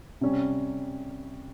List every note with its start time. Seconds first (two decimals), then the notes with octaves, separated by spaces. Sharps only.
0.21 C3 G3 C#4